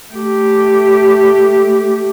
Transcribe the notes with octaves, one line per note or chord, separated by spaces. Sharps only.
A3 G4